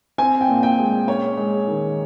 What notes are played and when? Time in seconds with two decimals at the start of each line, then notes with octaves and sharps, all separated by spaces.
0.18 C4 G#5
0.41 G5
0.48 A#2
0.63 G5
0.79 G#3
1.08 C#4 C#5
1.37 G#3
1.67 D#3